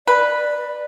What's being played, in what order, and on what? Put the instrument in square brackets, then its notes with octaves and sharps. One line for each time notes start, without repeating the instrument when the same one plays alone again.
[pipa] B4 [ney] D5